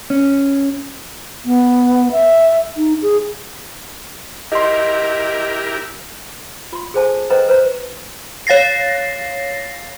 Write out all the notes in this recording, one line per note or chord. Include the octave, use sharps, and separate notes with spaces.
C#4
B3
E5
D#4
G#4
E4 G4 A#4 D#5 C6
F4 C6
G#4 A4 C5 G#5 A5
A4 B4 C5 D#5 G5 A#5
B4 C5 A#5
C#5 F5 A6 A#6 C7